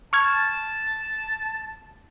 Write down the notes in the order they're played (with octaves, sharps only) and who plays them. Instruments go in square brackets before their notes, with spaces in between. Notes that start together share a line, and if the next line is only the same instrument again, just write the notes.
[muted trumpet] A5 [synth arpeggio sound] C#6 F6 G#6